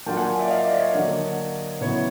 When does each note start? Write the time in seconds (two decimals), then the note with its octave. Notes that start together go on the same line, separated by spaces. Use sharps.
0.06 F#3 A#3 D4 F4 G5 A5
0.17 F#5 G#5
0.39 D5 E5
0.49 D#5 F5
0.65 D5 E5
0.79 C#5 D#5
0.94 D3 F#3 A#3 D4
1.81 C#3 F#3 B3 E4 B4 C#5